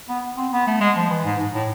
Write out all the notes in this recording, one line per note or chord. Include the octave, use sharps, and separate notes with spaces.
B3
C4
B3
A3
G#3
F3
E3
G#2
G#2
A2